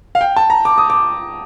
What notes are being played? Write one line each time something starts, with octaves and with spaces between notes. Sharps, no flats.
F5
G5
A5
A#5
D6
D#6
D6